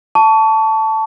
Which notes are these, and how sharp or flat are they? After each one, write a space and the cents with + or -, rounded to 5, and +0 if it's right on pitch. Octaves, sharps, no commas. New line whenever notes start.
A5 +0 C#6 +30